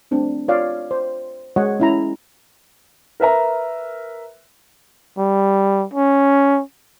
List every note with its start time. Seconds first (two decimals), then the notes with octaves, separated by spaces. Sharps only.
0.11 A3 C4 D4
0.48 F4 C#5 D5 F5
0.91 C5
1.56 G#3 F#4 C#5 D#5 F#5
1.80 C#4 E4 A#5
3.20 A#4 B4 E5 A#5
5.18 G3
5.94 C#4